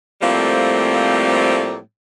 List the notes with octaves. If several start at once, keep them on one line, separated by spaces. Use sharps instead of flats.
A2 F3 G3 A3 A#3 C4